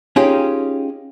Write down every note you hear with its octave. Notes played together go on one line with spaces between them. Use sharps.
C#4 D#4 F4 G4 G#4